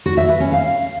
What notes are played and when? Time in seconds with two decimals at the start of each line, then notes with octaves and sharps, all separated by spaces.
0.06 F#4
0.17 E5
0.29 B4
0.40 C#4
0.52 F5